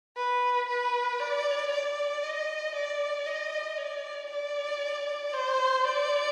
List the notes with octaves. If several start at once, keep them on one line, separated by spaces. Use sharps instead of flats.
B4
B4
D5
D5
D#5
D5
D#5
D5
D5
C5
D5